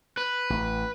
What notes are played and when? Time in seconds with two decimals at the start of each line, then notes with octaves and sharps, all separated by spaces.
0.17 B4
0.50 A1